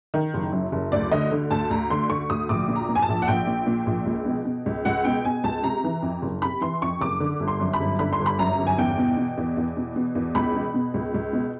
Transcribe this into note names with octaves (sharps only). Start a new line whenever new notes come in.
D#3
F#1
F#2
F#1
D2 D5
D3 D#5
D3
D2 A5
D2 A#5
D3 C6
D3 C#6
D2 D#6
A#1 D6
A#2
A#5
A#2
G#5
A5
A#1
F#5
A#1 G5
A#2
A#2
A#1
C#2
B2
B2
C#2
C#2 F#5
B2 G5
B2 G#5
C#2 A5
C3 A#5
E3
F2
F#1
C3 B5
E3 C6
F2 C#6
F#1 D6
D3
G1
C6
F#2
B5
G1
D3 B5
C6
G1
B5
F#2 A#5
G1
G#5
E2 G5
B2
B2
E2
E2
B2
B2
E2
C#2 B5
B2
B2
C#2
C#2
B2